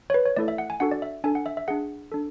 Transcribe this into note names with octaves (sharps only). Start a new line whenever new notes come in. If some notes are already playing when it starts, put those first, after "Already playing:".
C#5
B4
C#5
A3 E4 A4 D5
E5
F#5
G#5
D4 F#4 A4 F#5
D5
E5
D4 A4 G#5
F#5
E5
E5
D4 G#4 F#5
D4 A4